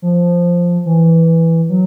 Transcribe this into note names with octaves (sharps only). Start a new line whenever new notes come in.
F3
E3
F#3